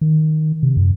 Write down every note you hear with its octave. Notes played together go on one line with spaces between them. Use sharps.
D#3
C3
F#2